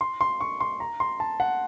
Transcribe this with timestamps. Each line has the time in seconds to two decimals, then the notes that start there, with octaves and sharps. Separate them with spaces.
0.01 C6
0.21 C6
0.41 C#6
0.60 C6
0.80 A#5
1.00 C6
1.20 A5
1.40 F#5